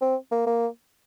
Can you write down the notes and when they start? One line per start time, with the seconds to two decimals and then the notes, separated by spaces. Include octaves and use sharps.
0.01 C4
0.32 A#3
0.46 A#3